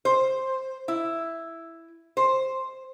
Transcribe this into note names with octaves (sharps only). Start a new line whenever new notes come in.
C5
E4
C5